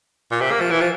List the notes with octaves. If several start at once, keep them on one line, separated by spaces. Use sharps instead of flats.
A#2
C3
A#3
F3
E3
F3